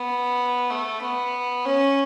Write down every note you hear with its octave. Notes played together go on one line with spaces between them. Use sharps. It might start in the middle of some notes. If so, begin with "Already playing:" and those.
Already playing: B3
A3
B3
C#4